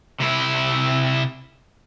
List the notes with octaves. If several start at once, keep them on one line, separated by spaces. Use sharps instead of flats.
C3 E4